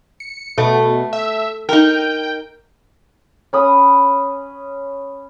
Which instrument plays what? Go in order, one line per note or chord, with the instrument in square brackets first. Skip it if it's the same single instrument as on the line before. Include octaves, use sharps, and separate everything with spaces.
[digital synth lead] C#7
[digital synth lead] B2 [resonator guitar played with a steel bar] A3
[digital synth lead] E5
[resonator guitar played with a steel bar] D#4 A#4 [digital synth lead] G5
[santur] C#4 B5 D#6